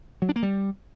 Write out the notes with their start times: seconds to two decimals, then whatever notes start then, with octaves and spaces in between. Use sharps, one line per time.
0.22 F#3
0.29 D4
0.36 A#3
0.43 G3